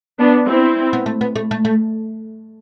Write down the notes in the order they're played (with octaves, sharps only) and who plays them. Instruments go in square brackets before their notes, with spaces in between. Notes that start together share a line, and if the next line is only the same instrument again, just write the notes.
[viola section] B3 D4
C4 E4
[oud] B3
A3
B3
A3
A3
A3